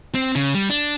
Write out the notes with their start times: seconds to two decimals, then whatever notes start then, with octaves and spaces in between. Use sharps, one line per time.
0.15 C4
0.35 C#3
0.55 G3
0.70 D4